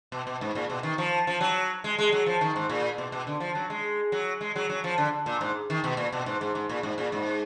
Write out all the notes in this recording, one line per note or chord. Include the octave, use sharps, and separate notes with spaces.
B2
B2
G#2
A#2
B2
D#3
F3
F3
F#3
G#3
G#3
F#3
F3
D#3
G#2
A#2
B2
B2
D3
F3
F#3
G#3
F#3
G#3
F#3
F#3
F3
D3
A#2
G#2
D#3
B2
A#2
B2
G#2
G#2
G#2
A#2
G#2
A#2
G#2